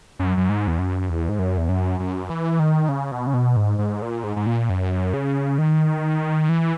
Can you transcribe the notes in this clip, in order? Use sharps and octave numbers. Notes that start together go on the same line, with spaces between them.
F#2
F#2
G#2
E2
F#2
E2
G#2
F#2
E2
F#2
F#2
E3
D#3
C#3
B2
C#3
B2
G#2
G#2
A#2
G#2
G#2
A#2
F#2
C#3
D#3
E3